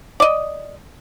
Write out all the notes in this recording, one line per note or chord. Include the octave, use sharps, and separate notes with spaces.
D5 D#5